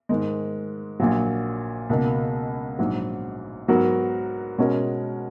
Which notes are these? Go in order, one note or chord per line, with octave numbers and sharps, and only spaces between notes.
G#2 D#3 G#3
A#1 A#2 F#3
C#2 B2 A#3 D#4
A#1 G#2 F#3
G#2 F#3 B3 F#4 A#4
B2 G#3 C#4 F#4 A#4